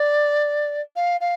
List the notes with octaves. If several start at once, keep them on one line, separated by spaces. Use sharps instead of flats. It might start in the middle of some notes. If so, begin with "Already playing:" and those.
Already playing: D5
F5
F5